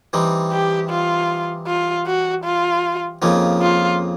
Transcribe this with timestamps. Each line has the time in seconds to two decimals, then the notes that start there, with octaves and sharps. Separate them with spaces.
0.13 E3 G3 C4 D#4
0.52 G4
0.90 F4
1.67 F4
2.07 F#4
2.44 F4
3.22 F2 C#3 F3 A#3 D#4
3.62 F4